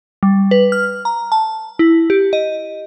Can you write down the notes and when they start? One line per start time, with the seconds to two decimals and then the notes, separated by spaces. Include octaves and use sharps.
0.23 G3
0.51 B4
0.72 F6
1.05 A#5
1.32 A5
1.79 E4
2.10 G4
2.33 D#5